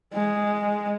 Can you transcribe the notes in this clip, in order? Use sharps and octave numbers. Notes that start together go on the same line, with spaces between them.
G#3